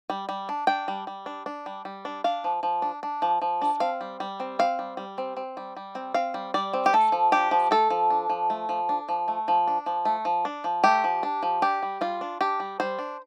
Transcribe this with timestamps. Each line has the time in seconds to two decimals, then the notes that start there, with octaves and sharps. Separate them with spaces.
0.10 G3
0.29 G3
0.49 D4
0.67 D4 G5
0.88 G3
1.07 G3
1.26 D4
1.46 D4
1.66 G3
1.85 G3
2.05 D4
2.24 D4 F5
2.44 F3
2.63 F3
2.82 D4
3.03 D4
3.22 F3
3.42 F3
3.62 D4
3.80 C4 F5
4.01 G3
4.20 G3
4.40 C4
4.59 C4 F5
4.79 G3
4.97 G3
5.18 C4
5.37 C4
5.57 G3
5.77 G3
5.95 C4
6.14 C4 F5
6.34 G3
6.54 G3 D5
6.73 C4
6.86 G4
6.93 A3 A4
7.12 F3
7.32 D4 G4
7.51 F3
7.71 A3 A4
7.90 F3
8.10 D4
8.29 F3
8.50 A3
8.69 F3
8.89 D4
9.09 F3
9.28 A3
9.48 F3
9.68 D4
9.86 F3
10.05 A3
10.25 F3
10.45 D4
10.64 F3
10.84 A3 G4
11.04 F3
11.23 D4
11.43 F3
11.62 D4 G4
11.83 G3
12.01 G3 F4
12.21 D4
12.41 D4 G4
12.60 G3
12.80 G3 C5
12.99 D4